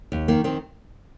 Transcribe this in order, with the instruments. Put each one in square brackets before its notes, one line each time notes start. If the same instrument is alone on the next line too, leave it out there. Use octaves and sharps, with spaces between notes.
[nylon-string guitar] D#2
D#3 A#3
D#3 C4